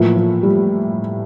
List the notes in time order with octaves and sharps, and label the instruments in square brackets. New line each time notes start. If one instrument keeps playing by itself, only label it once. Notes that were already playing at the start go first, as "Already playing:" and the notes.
Already playing: [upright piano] A2 E3 A#3 [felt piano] F3
[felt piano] F3
G3